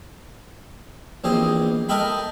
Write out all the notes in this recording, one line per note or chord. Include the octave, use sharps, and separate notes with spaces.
A#1 E2 C4 G4 D#5
A4 A#4 D#5 E5 G5 B5